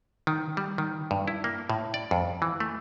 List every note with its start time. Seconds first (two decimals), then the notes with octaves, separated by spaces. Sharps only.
0.27 D#3
0.57 G3
0.78 D#3
1.11 G2
1.28 E4
1.44 A#3
1.70 A2
1.94 D5
2.11 F2
2.42 E3
2.60 A3